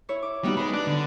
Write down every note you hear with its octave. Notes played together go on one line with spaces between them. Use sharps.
E4 C#5
D6
G3 B3 D#4 F#4
G#3 B4 B5
D4 F#6
D3